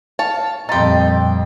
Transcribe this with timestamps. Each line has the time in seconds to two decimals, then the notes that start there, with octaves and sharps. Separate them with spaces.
0.19 C#5 F5 A5
0.69 F2 A#2 G3 D#4 G4 C6 A6